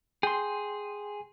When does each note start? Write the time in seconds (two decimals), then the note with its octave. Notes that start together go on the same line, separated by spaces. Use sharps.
0.23 G#4 G5 C6